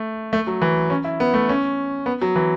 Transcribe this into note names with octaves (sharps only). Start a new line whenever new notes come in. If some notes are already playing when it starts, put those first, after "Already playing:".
Already playing: A3
A3
F#3
E3
C#4
E4
B3
A3
C#4
B3
F#3
E3